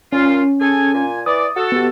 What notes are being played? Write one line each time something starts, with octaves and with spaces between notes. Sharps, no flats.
A#2 C#4 F4
G#4 A4 G#5
A#2 G#5
E3 D5 D#6
F#4 A4
B3 G4